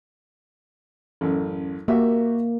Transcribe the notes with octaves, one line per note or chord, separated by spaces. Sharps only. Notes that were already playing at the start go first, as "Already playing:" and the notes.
A1 F#2
A#3 F#4 G4 E5